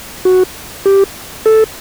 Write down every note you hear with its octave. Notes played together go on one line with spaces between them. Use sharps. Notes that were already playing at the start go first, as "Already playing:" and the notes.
F#4
G4
A4